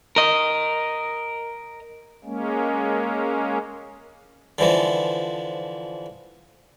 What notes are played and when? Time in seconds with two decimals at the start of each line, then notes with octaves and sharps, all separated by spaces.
0.16 A#4 D#5
2.24 G#3 A#3 C#4
4.59 D3 E3 F3